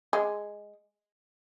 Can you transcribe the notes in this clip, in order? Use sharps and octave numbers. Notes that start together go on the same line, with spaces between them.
G#3